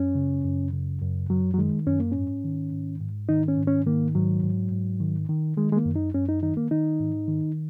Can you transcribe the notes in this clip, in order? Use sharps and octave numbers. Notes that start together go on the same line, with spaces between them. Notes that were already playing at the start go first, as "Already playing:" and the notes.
Already playing: F#2 C#4
C#3
F#2
C#3
F#2
F#2 F#3
F#3
D#3 G#3
F#2 C#4
A#3
G#2 C#4
D#3
G#2
G#2
D#3 D#4
C#4
G#2
C#4
D#3 A#3
G#2 F#3
G#2
G#2
D#3
D#3
D#3 G#3
G#3
A#3
F#2
D#4
F#2 C#4
D#4
D#3 D#4
A#3
D#3 D#4
G#2
D#3